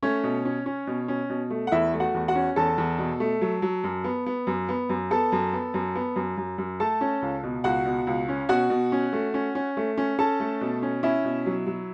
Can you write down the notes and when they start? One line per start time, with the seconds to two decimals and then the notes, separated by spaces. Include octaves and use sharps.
0.03 A3 C#4 C#5
0.24 B2
0.45 C#4
0.66 C#4
0.87 B2
1.08 C#4
1.30 B2
1.50 A3
1.67 F#5
1.72 E2 E4 E5
1.94 A3
2.00 F#4 F#5
2.14 E2
2.28 F#4 F#5
2.35 C#4
2.56 E2 A4 A5
2.78 E2
2.99 B2
3.20 A3
3.41 F#3
3.62 F#3
3.84 F#2
4.04 B3
4.26 B3
4.47 F#2
4.69 B3
4.89 F#2
5.11 B3 A4 A5
5.32 F#2
5.53 B3
5.74 F#2
5.95 B3
6.16 F#2
6.37 F#2
6.58 F#2
6.80 A3 A4 A5
7.01 C#4
7.22 C#2
7.43 B2
7.64 C#2 F#4 F#5
7.86 B2
8.07 C#2
8.28 C#4
8.49 B2 F#4 F#5
8.70 B2
8.92 C#4
9.13 A3
9.34 C#4
9.55 C#4
9.77 A3
9.97 C#4
10.19 C#4 A4 A5
10.40 A3
10.61 B2
10.82 C#4
11.03 C#4 E4 E5
11.24 B2
11.46 F#3
11.67 F#3